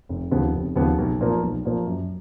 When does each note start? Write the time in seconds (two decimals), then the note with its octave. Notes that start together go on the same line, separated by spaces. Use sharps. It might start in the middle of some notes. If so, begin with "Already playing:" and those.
0.09 F1
0.31 D#2 C#3 F3 B3
0.53 F1
0.76 D#2 C#3 F3 B3
0.98 B1
1.21 A#2 F3 A#3
1.43 B1
1.65 A#2 F3 A#3
1.87 F#2